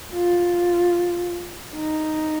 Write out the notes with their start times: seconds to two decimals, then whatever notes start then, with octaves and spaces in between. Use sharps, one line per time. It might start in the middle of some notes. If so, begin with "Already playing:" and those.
0.13 F4
1.76 D#4